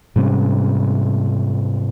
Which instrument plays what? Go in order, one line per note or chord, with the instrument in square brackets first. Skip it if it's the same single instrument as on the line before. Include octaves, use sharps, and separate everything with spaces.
[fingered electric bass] G#2 C3 G3 C#4